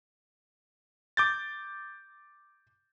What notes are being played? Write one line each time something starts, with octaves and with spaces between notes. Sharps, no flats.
D6 G6 A6